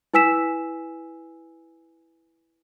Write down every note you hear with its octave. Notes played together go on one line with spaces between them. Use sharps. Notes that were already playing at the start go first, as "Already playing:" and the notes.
E4 B4 G#5 E6 B6 E7